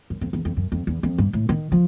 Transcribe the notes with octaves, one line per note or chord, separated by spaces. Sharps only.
F#2
F2
E2
F2
F#2
F2
E2
F2
G2
A2
D#3
F3